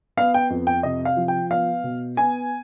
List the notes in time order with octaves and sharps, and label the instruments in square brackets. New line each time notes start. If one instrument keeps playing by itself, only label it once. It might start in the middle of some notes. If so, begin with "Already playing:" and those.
[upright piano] B3 F5
G5
F2
G5
C3 D#5
F5
F3
G5
B3 F5
B2
B3 G#5